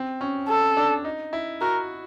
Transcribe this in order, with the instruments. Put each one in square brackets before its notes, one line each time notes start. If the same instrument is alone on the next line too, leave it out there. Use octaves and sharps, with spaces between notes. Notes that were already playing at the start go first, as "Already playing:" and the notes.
Already playing: [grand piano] C4
C#4
[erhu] A4
[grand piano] D4
D#4
E4
[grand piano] F#4 [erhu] A#4